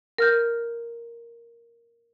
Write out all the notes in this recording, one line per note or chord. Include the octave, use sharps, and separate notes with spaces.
A#4 F6 G6